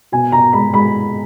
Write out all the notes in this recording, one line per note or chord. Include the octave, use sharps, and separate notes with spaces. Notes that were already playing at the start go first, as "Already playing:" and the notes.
B2 G#5
B2 A#5
G#3 B5
G#3 B5